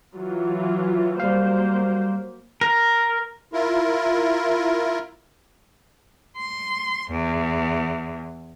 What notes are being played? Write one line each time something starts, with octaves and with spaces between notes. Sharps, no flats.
E3 F#3 F4
F#3 G3 A#3 C5 F5
A#4
E4 F4 A#4
C6
E2